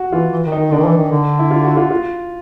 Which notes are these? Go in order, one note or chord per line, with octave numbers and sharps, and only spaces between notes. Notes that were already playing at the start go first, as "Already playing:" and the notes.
Already playing: F#4
E3 F4
E3
D#3
D#4
D#3
D3 D4
D#3
E3
D#3
D3
E4
F4
F#4
F4
F4